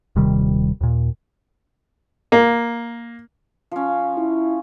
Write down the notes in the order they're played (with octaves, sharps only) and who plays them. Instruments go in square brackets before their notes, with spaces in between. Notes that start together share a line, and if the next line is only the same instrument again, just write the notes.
[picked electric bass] D#1 C3 D#3 G3
D#2 A#2
[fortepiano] A#3
[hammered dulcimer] F3 C#4
[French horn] E4